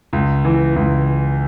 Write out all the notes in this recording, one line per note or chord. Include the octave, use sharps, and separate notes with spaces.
C#2
E3
C#2